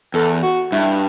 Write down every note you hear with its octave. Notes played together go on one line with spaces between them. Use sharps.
E2 A4
F#4
G2 E4